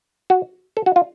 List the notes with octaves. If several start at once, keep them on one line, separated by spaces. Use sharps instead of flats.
F#4
A4
F#4
F4